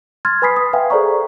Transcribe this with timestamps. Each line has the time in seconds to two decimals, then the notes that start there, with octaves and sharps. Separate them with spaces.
0.25 C6 F6 G#6 A6
0.42 B4 G#5 B5 D#6 B6 C7
0.57 D#6
0.73 B4 E5 F5 G5 G#5
0.90 G#4 A4 C5 D5 A#5 C#6